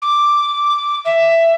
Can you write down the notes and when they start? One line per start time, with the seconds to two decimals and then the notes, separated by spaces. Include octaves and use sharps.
0.01 D6
1.04 E5